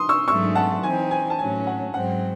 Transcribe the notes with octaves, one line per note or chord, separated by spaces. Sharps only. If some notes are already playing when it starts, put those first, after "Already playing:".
Already playing: C6 D#6
C#6 E6
G#2 F#3 A3 C#6 E6
F#5 A5
E3 C4 D#4 G#5
G#5
A5
A2 F#3 C#4 G#5
F#5
G#2 F#3 C4 F#5